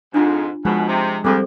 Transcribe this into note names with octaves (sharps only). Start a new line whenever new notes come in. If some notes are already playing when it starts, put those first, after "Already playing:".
F2 G#2 D4 F4
F#2 B2 F3 G#3 G#4
C3
D2 G3 C4 G#4 A4